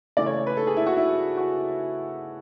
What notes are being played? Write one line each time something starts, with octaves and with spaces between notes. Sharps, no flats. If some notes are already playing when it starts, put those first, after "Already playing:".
C#3 E3 A3 D5
C#5
B4
A4
G#4
E4
F#4
E4
F#4